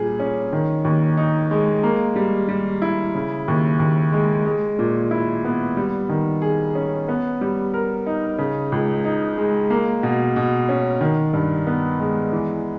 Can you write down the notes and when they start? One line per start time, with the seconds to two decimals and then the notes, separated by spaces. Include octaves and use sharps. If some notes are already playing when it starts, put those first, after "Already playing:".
Already playing: A#2 G3 G#4
0.20 C#4
0.53 D#3
0.85 D#2
1.17 D#4
1.51 G#3
1.84 A#3
2.16 G3
2.48 G3
2.82 E4
3.14 C#3
3.48 D#2
3.80 D#2
4.12 G#3
4.46 G#3
4.79 A#2
5.11 E4
5.45 B3
5.77 G3
6.09 D#3
6.42 G#4
6.75 C#4
7.08 B3
7.41 G3
7.74 A#4
8.06 D#4
8.38 C#3
8.72 C#2
9.04 D#4
9.38 G#3
9.70 A#3
10.03 B2
10.36 B2
10.69 C#4
11.01 D#3
11.33 G2
11.67 B3
12.00 G#3
12.32 E3